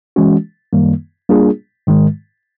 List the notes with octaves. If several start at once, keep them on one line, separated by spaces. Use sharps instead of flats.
E3 G#3 C#4 F#4
F#2 D#3 G3 A#3
G3 A#3 D4 F4 G#4
G#2 D#3 G#3